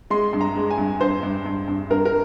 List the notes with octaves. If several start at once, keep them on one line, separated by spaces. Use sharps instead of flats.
G#3 C6
G2
A#5
G#3
G#5
G2
G2 C5
G2
G2
G2
G2 A#4
A#4